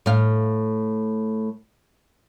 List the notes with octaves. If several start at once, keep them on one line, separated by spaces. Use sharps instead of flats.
A2 F5